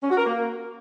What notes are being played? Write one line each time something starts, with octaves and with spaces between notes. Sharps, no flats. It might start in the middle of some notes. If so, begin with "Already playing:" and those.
C#4
F#4
A#4
A#3